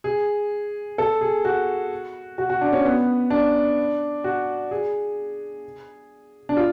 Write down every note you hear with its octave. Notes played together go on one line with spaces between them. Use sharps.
G#4
A4
G#4
F#4
F#4
F#4
D4
C#4
B3
D4
F#4
G#4
D4
F4